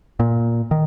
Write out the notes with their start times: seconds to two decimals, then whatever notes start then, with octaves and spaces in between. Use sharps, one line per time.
0.20 A#2
0.71 D#3